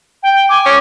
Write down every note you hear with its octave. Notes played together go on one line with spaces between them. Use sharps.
G5
G#5 D6
C#4